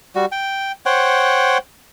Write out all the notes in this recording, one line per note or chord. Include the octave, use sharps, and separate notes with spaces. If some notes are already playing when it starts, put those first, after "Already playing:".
G3 F#4
G5
C5 C#5 F#5 G5